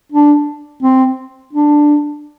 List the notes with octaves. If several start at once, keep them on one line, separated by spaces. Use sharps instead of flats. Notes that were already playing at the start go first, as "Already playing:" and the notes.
D4
C4
D4